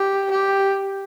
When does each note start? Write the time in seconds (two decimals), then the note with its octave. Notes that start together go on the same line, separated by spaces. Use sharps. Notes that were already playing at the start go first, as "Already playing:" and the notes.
Already playing: G4
0.31 G4